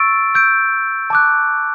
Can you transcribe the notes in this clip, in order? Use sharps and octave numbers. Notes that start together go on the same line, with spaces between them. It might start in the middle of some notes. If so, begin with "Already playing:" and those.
Already playing: C#6 E6 A6 D7
E6 G6 D7
A5 D6 F#6